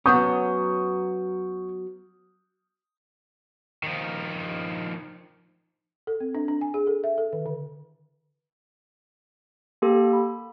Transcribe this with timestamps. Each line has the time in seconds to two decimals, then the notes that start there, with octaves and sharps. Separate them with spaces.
0.06 F#3 B3 C#4 C#6 D#6 G6
3.83 D#3 F3
6.07 A4
6.20 C4
6.35 D4
6.48 D4
6.61 G#5
6.74 G#4
6.87 A4
7.04 E5
7.18 A4
7.33 D#3
7.46 D3
9.82 A#3 G4 A4
10.13 B5